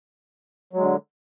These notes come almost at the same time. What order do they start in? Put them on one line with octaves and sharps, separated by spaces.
F#3 G#3 D3